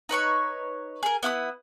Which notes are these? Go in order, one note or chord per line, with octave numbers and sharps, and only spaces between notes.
D#4 B4 C#5 C#6
G#4 A#4
B3 E4 F#5 D#6